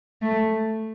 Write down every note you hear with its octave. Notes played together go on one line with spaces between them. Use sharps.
A3